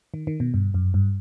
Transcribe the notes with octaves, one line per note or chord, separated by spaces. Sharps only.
D#3
D#3
B2
G2
F#2
G2